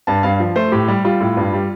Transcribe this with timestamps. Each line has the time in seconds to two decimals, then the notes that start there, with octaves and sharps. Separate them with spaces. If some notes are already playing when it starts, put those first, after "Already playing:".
0.07 G2 A5
0.23 G2 F5
0.40 F3
0.56 A3 C5
0.72 A2 G4
0.88 G3
1.05 G3 F4
1.20 A2
1.37 G2
1.53 G3